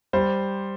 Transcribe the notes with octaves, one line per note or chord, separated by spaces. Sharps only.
G3 C5